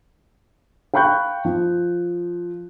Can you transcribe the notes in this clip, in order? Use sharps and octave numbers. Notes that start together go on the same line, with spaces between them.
F5 G5 B5 C#6 F#6 G6
F3